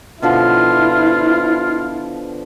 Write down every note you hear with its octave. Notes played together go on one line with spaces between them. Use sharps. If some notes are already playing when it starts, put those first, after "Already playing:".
B2 D3 F3 E4 F4